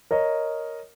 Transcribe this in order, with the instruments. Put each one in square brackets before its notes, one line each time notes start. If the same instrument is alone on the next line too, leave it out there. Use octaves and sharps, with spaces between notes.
[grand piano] A#4 C#5 D#5